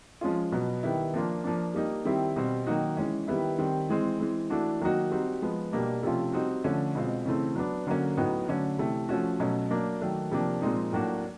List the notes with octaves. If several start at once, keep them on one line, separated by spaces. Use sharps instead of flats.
F3 G#3 C#4 F4
B2 F#3 B3
D#3 G3 B3 E4
F3 A#3 D4 F4
F3 A#3 D4
G3 A#3 D#4
D#3 G3 C4 E4
B2 G3 C4
D#3 F#3 A#3 D#4 F#4
E3 G#3 C#4
D#3 G3 B3 E4
D#3 G3 C4
E3 G#3 C4
E3 G#3 C4
E3 A3 D4 F#4
D#3 F#3 A#3 D#4 F#4
G3 C4 D#4 F#4
F3 G#3 B3
B2 G3 A#3 D4
C3 F3 A3 C#4 F4
G3 C4 D#4 F#4
D3 F3 A3 C#4
B2 G#3 C4 F4
C#3 E3 A3 C4
F#3 B3 D4
D3 F#3 A#3 C#4
A2 F#3 B3 D#4 F#4
D3 F#3 A3 C#4
C3 E3 A3
F3 A3 C#4 F#4
B2 F#3 A3 C#4
F#3 A#3 D4
D#3 F#3 A3
C3 F3 A#3 D4
A#2 F3 G#3 C4 D#4
A2 F#3 A#3 D4 F#4